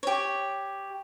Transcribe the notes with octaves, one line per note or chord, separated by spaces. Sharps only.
G4 C#5